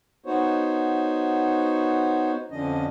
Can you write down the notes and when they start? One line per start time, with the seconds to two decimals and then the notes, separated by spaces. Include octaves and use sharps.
0.26 B3 D#4 F#4 C5 C#5
2.51 F2 D3 F3 C#4 D4 D#5